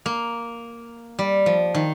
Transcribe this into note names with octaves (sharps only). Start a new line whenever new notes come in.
A#3
G3
F3
D#3